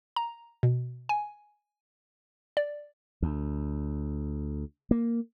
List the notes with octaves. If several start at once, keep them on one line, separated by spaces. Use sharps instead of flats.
A#5
B2
G#5
D5
D2
A#3